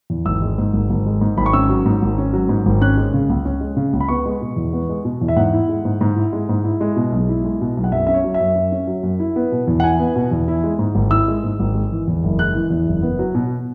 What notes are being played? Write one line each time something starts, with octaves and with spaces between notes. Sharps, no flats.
E2
G#1 E6
G#3
G#2
G#1
G#1
G#3
G#2
G#1 B5
C#6
C#4 E6
F#3
G#2
G#1
C#4
F#3
G#2
G#1
C#4 F#6
G#3
C#3
C#2
C#4
G#3
C#3
C#2
B5
B3 C#6
G#3
B2
E2
B3
G#3
B2
E2
E5
G#2 F#5
E4
G#3
G#2
G#2
E4
G#3
G#2
E4
G#3
B2
B1
E4
G#3
B2
B1
F#5
F#2 E5
C#4 E5
C#5
F#3
E5
F#2
F#2
C#4
F#3
F#2
E4
B3
B2
E2
F#5
E4 G#5
B3
B2
E2
E4
G#3
G#2
G#1
E4 E6
G#3
G#2
G#1
G#3
E3
E2
F#1
G#3 F#6
E3
E2
F#1
B3
F#3
B2